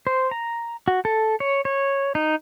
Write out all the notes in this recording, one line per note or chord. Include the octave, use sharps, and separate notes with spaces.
C5
A#5
F#4
A4
C#5
C#5
D#4